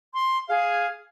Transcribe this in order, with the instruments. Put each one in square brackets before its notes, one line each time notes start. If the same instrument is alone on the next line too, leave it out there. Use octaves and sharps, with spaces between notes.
[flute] C6
[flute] G#4 [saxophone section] F5